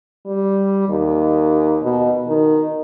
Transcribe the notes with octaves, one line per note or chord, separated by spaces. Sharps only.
G3
D#2
B2
D#3